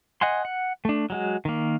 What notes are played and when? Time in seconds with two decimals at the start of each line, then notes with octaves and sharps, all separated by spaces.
0.21 D#5 F#5 G#5 C6
0.45 F#5
0.85 A3 D4
1.10 F#3 G#3 F#4
1.45 D#3 A#3